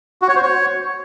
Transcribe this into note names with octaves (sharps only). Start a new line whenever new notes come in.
F#4
C#5
C5
C#5